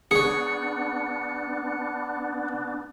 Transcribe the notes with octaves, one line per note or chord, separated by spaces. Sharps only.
B3 D4 G#4 C#5 C#7